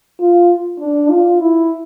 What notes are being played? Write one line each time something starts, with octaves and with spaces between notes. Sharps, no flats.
F4
D4
F4
E4